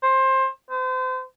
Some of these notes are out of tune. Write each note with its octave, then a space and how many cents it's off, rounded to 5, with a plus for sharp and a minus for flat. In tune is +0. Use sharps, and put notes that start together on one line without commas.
C5 +20
C5 -35